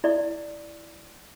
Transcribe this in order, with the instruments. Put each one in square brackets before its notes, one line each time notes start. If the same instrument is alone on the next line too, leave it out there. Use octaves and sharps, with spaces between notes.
[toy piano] E4 D5